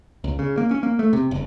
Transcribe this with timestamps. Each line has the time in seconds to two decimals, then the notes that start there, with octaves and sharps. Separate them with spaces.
0.24 C#2
0.39 C#3
0.58 A#3
0.71 C#4
0.83 A#3
0.99 A3
1.13 C3
1.31 F#1